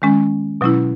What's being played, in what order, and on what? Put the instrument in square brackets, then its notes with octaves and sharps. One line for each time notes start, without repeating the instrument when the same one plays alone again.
[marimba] D#3 G#3 C#4
B2 F#3 C#4 E4